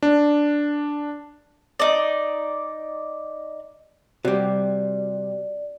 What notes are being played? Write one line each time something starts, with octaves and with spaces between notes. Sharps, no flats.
D4
D#4 D5
C3 G3 F#4 D5